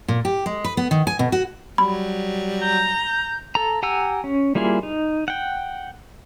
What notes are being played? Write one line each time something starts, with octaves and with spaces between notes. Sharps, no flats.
A#2
G4
G#3
B4
B3
D#3
G#5
B2
F#4
F#3 G3 B5
A#5 G6
A4 A#5
G4 F#5 G#5 A#5 E6
C#4
G3 A#3 E4 F4 G#4
D#4
F#5 G5